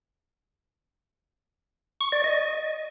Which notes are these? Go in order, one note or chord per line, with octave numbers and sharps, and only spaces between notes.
C#6
D5
D#5